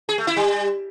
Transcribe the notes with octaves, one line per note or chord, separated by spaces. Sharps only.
G#4
A3
E4
G3